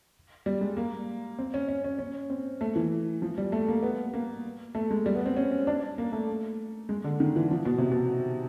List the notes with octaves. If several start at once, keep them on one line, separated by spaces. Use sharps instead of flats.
G3
G#3
A#3
C4
C#4
C#4
C#4
C#4
C4
A3
E3
F3
G3
A3
A#3
B3
A#3
A3
G#3
G3
B3
C4
C#4
C#4
D4
A#3
A3
G#3
D3
D#3
E3
F3
B2
C3
B2